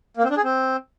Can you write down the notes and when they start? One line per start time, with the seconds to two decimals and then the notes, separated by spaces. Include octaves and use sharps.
0.17 A#3
0.24 C4
0.30 D4
0.37 G#4
0.44 C4